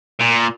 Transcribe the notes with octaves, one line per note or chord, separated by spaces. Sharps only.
A#2